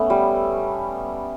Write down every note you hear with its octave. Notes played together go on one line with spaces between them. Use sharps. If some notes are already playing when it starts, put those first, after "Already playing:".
Already playing: A3 B3 C#4
G3